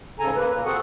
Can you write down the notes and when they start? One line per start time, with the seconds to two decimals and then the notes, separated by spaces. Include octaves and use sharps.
0.20 G#2 C#3 A4 G#5 A#5
0.36 A#3 B4
0.49 A#2
0.65 C4 F#4 G#4 A4 F#5